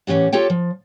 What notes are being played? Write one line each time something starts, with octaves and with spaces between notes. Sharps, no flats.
A2 E3 C#4 G4 F#5
F4 G4 A4 C#5 G5
F3